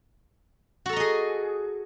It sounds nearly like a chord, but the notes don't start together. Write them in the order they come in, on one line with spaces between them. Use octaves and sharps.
F#4 A4 A#5 D#5 G#4